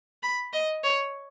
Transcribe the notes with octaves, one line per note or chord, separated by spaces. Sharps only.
B5
D#5
C#5